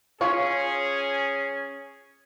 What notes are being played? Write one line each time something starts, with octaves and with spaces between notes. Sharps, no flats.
C#4 F4 G#4 C#5